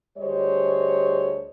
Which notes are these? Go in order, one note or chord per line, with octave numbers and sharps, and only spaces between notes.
D2 G3 G#4 C5 C#5 D#5